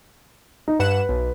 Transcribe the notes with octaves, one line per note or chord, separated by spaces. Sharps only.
D#4
G2 B4 F#5 E7
B1